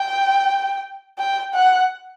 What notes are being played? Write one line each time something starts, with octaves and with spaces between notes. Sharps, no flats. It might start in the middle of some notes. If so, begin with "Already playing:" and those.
Already playing: G5
G5
F#5